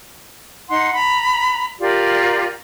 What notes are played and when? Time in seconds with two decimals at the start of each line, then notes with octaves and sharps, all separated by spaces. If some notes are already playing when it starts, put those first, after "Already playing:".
0.69 D#4 F#5 C6
0.94 A#5 B5
1.80 F4 G4 A#4 D5